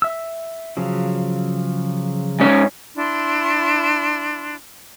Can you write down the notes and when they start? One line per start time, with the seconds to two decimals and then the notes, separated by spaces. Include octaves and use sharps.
0.02 E5 E6
0.77 C#3 F3 F#3
2.40 G#2 C#4
2.95 D4 E4 C6